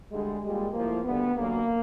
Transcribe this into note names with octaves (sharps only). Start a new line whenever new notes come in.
D2 D3 G3 G#3
A#2 G3 G#3
A2 F3 A#3
D2 D3 G3 B3
F#2 D3 F#3 A#3